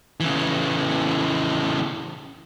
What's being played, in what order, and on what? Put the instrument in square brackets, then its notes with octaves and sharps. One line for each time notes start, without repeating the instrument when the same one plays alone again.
[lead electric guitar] C#3 E3